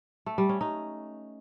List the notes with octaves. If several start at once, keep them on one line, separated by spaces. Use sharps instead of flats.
A3
G3
C#4
D#4